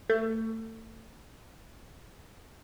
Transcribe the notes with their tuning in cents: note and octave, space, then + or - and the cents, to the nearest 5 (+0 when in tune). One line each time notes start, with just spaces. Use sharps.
A3 +25